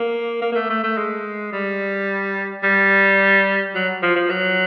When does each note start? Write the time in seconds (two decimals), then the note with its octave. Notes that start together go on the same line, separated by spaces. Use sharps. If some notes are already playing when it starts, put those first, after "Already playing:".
Already playing: A#3
0.42 A#3
0.52 A#3
0.56 A3
0.70 A3
0.83 A3
0.98 G#3
1.53 G3
2.64 G3
3.75 F#3
4.03 F3
4.16 F3
4.30 F#3